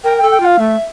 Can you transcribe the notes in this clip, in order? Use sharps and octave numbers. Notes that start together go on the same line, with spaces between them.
A#4 G5
G5
A4
G5
F4 F5
A3 E5